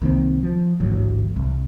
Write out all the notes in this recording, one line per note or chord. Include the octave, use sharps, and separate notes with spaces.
C2 D#3 A#3 C4
F3
A1 D2 G#2 F#3
C2